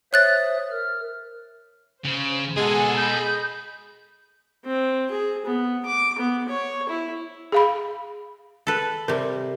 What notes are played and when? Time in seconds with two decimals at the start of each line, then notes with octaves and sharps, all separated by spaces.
0.13 C5 C#5 E5 D#6 F#6 A6
0.71 A#4 F6
2.05 C#3 C5
2.57 B2 G#3 G#4 A4 F#5 G#5
2.97 D#5 B5 G6
4.65 C4
5.11 G#4
5.45 B3
5.85 D6
6.18 B3
6.48 C#5
6.89 E4
7.52 G#4 F5 B5
8.67 A4 B4
9.08 C3 G3 A#4